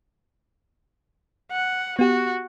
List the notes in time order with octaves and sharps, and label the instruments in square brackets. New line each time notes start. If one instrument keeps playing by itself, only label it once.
[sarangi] F#5
[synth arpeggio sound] B3 G4 [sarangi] F#4